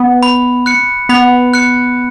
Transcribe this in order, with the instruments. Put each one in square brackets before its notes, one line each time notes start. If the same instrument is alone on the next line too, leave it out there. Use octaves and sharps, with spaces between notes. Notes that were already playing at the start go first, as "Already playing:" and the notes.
Already playing: [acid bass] B3
[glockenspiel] B5
F#6 C#7
[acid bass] B3 [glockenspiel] B5
[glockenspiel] F#6 C#7